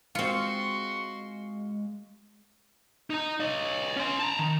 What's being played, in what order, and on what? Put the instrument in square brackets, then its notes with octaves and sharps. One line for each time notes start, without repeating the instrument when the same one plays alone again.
[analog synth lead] G#3 [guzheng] C4 F4 [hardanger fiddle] F#4 C6 [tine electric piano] F5 C#7
[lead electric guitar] D#4 A#5
C#5 D#5
C#4 C6
A5 A#5
D#3